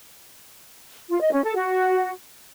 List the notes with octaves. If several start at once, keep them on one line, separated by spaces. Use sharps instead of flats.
F4
D#5
C#4
A4
F#4